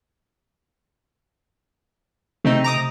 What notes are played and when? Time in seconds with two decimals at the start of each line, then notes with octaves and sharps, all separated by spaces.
2.44 C3 A3 C4 D#4
2.64 A#5 D6 D#6